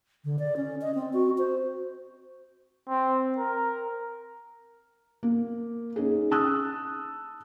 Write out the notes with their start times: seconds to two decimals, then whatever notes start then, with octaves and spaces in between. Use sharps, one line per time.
0.25 D3
0.39 D5
0.57 C#4
0.81 D#5
0.94 C4
1.13 F#4
1.38 C5
2.89 C4
3.38 A#4
5.23 A#3
5.96 C#4 D#4 G#4
6.31 A5 D#6 E6 F#6